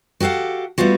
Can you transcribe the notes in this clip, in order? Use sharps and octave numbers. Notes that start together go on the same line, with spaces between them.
F#4 G4 A4 F5 F#5
G3 A3 B3 F4 F#4